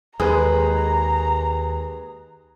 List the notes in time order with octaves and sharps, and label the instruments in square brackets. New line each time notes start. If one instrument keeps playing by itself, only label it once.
[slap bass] D#2 [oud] G#3 [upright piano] G#4 B4 [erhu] A#5